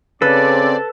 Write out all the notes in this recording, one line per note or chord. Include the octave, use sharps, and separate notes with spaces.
C#3 C4 A4 B4 D5